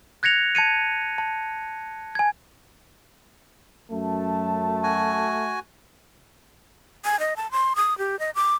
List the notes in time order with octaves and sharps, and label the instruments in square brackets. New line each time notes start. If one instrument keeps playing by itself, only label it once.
[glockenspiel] F#6 G#6 A#6 C#7 F7
A5 G#6 C#7 D#7
A5
G#5 G#6
[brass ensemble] F#2 A5 [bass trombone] A3
[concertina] F#4 G#5
[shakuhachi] G#5
D#5
A5
C6
D#6
G4
D#5
D6